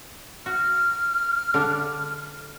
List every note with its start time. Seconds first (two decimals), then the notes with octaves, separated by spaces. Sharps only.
0.46 F#4 F6
1.54 D3 D4